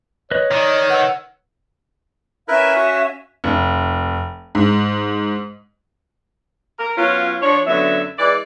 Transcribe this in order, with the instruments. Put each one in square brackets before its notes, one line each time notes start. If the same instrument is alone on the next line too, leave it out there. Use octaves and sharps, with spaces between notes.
[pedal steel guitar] B4 D#5 [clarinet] C#5
[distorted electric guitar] D#3 [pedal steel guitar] D5 D#5 D6
[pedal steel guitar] B4 E6 [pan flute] F#5
[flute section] C#4 E5 F5 [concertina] E4 A#4 B4
[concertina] F#4
[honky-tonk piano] F1
G#2
[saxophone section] A#4
F#3 B3 C#4 F4
F3 D4 C#5
F#2 D3 F#3 B3 E5
E3 G#3 D5